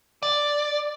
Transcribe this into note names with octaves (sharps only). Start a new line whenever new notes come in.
D5